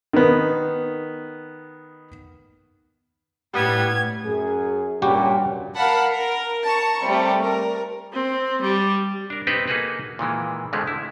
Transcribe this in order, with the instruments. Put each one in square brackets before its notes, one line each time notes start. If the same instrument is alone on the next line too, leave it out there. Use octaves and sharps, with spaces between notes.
[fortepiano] D#3 B3
[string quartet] A2 G#6 [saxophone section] G3 B3
[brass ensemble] F#2 G#4
[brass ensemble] G2 A#2 C#4 [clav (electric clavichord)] G3 F#4 G4
[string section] A#4 F5 F#5 A5 B5
A#4
A5 A#5 C#6
C3 G3 A3
A#4
[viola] C4
G3
[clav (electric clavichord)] D4 A#4
B3 C4 D#4 G4 B4 C5
A#3 D#4 F#4 G#4 A4 B4
A#2 D#3 E3 G#3
F2 D3 F3 G#3 A3
E4